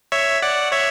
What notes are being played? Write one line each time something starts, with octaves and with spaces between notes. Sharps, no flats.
C#5 E5
D5 F#5
C#5 E5